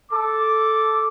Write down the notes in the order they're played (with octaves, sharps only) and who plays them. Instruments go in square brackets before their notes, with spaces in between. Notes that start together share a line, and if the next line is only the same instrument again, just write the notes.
[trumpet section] A4 D6